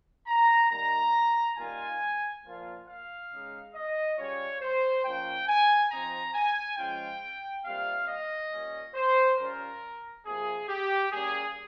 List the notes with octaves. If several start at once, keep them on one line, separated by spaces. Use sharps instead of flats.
A#5
D#3 G3 A#3 A#5
D#3 G3 A#3 F4 G#5
A#2 F3 A#3 F4
F5
C#3 G#3 D#4
D#5
C#3 G3 C#4 F4 C#5
C5
F3 A#3 C#4 F4 G5
G#5
F3 C4 D#4 A#5
G#5
F3 G#3 C#4 F4 G5
C3 G3 A#3 F4 F5
D#5
A#2 G3 C#4
C5
G3 C#4 F4 A#4
C3 F3 A#3 G#4
G4
G3 A#3 C#4 G#4